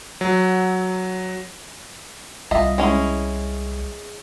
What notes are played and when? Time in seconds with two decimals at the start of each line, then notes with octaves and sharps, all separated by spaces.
0.21 F#3
2.51 C2 G3 F4 D#5 E5
2.78 G#3 C#4 E4